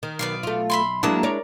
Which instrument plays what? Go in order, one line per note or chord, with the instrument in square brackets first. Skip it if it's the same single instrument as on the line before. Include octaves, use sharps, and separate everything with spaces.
[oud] D#3
[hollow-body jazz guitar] B1 [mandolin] B3 D5 F5
[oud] A3 F4
[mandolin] E5 B5 C6
[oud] F#3 A#3 [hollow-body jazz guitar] G#3 D4 E4 [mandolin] A5 D#6
[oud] A#4 C#5 D5